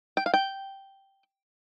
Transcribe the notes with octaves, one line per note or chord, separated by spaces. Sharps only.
G5
F5
G5